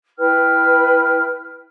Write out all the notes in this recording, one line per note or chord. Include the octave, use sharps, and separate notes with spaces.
E4 B4 G5 F6